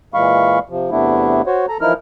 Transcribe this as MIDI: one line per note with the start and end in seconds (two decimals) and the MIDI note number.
0.14 0.59 46
0.14 0.59 52
0.14 0.59 56
0.14 0.59 77
0.14 0.59 83
0.14 0.59 85
0.70 0.91 48
0.70 0.91 53
0.91 1.42 40
0.91 1.42 48
0.91 1.42 57
0.91 1.42 59
0.91 1.42 62
0.91 1.42 64
1.46 1.66 66
1.46 1.66 72
1.46 1.66 73
1.69 1.78 69
1.69 1.78 82
1.81 1.93 52
1.81 1.93 53
1.81 1.93 63
1.81 1.93 64
1.81 1.93 70
1.81 1.93 89